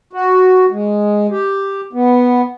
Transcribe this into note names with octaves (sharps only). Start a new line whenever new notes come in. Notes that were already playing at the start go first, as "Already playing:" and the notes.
F#4
G#3
G4
B3